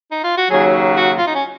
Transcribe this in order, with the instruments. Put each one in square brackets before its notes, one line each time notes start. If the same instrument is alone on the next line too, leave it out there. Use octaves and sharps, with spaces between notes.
[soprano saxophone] D#4
F4
F#4
[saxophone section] D#2 C#3 F#3 [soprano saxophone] G#4
[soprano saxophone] F#4
F4
D#4
C#4